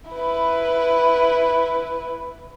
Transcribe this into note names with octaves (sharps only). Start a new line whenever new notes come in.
E4 B4